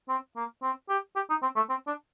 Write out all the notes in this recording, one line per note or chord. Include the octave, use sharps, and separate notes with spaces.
C4
A#3
C4
G4
G4
D#4
C4
A3
C4
D4